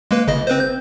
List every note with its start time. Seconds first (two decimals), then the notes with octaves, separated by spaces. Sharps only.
0.11 G#3 A#3 B4
0.28 G1 C#3 D#5
0.47 C4 B4 C5
0.60 G6